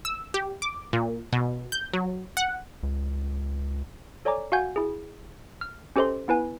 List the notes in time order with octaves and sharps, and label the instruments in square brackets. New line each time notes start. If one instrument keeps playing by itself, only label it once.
[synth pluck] E6
G4
D6
A#2
B2
G6
F#3
F#5
[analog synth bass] C#2
[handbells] A4 C#5 D5 G#5 A#5 D6
F#4 F5 F#5 G#5 G6 G#6
E4 G#4
F6
C#4 G4 A4 C5 D#5 C6
B3 E4 B4 G#5